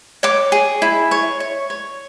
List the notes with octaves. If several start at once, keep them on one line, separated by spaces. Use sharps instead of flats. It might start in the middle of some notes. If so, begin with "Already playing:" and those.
C#5 D6
G#4
E4
C#5
C#5
C#5